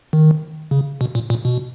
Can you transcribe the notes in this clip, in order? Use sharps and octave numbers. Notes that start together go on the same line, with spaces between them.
D#3
C#3
B2
A#2
A#2
B2